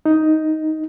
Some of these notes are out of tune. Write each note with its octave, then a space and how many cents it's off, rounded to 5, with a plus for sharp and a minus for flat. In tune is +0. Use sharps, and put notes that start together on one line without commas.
D#4 +5